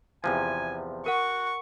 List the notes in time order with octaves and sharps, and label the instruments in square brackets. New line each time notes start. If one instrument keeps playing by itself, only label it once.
[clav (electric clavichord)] E2 C3 F3 [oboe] G#5
[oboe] F#4 [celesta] A#4 F#5 [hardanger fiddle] C#6